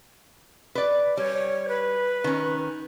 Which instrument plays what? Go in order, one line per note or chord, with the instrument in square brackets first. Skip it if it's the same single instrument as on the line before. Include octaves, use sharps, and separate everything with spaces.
[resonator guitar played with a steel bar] B4 D5
[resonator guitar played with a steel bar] G3 [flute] C#5
[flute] B4
[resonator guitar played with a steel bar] D#3 C#4